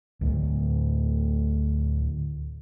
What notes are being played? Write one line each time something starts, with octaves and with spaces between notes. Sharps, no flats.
D2 A2